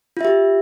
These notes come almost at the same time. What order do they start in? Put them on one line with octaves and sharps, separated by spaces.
F4 E5 G4